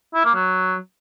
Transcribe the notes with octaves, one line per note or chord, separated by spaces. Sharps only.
E4
A#3
F#3